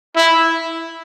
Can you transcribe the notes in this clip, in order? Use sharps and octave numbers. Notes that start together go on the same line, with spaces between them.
E4